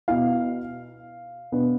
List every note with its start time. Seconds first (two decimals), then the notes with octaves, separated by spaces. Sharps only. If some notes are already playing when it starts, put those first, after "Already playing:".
0.08 B2 B3 E4 F5
1.52 B2 B3 D4